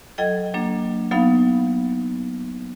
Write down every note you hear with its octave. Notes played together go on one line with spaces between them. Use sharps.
F#3 A4 D#5 G5 G#6
F#3 A#3 D4
F#3 B3 D#4 F5 B5